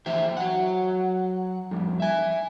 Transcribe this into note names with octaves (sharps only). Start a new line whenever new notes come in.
E3 C5 E5 G5
F#3 F#5
F2 G3
E5 G#5